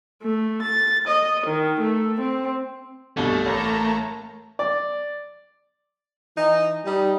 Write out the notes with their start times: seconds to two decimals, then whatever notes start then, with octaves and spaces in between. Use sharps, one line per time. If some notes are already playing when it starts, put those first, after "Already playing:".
0.23 A3
0.63 A6
1.09 D#5
1.47 D#3
1.82 A3
2.21 C4
3.17 C2 G2 B2 A3
3.46 A1 A#3 A5 A#5
4.59 D5
6.37 E3 D#4
6.84 G3 D#4